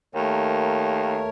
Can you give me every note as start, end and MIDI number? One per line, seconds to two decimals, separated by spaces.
0.15 1.25 39
0.15 1.30 57
0.15 1.30 70
0.15 1.30 73